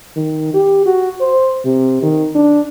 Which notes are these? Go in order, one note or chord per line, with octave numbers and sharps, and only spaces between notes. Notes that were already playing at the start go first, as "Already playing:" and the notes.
D#3
G4
F#4
C5
C3
D#3
D4